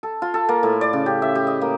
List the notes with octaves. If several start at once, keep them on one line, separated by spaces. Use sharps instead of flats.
A4
F4
A4
A#3
A2
D5
C#3
G4
E5
G4
D#5
A#3